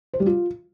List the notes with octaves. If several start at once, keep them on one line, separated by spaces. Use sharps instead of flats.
C5
G3
F4